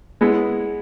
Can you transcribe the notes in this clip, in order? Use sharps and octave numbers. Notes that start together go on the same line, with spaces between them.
G#3 B3 E4